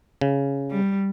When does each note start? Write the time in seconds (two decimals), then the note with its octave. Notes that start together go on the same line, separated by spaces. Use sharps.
0.21 C#3
0.70 G3